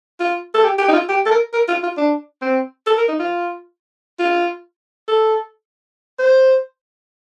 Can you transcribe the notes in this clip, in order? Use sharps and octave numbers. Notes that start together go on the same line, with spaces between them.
F4
A4
G4
G4
D#4
F4
G4
A4
A#4
A#4
F4
F4
D4
C4
A4
A#4
D#4
F4
F4
A4
C5